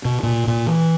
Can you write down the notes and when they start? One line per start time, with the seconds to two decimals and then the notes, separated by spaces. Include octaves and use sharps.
0.05 B2
0.23 A#2
0.47 A#2
0.67 E3